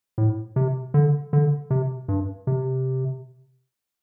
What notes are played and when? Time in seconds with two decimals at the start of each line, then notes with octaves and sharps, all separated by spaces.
0.18 A2
0.56 C3
0.94 D3
1.33 D3
1.70 C3
2.08 G2
2.47 C3